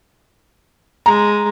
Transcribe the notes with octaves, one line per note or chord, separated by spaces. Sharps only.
G#3 A#5